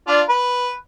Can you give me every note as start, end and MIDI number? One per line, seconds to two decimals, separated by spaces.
0.08 0.21 62
0.08 0.21 65
0.08 0.21 74
0.29 0.70 71